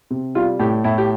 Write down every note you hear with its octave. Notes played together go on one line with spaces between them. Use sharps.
C3
G3 F4
A2 G4
A2 E4
G4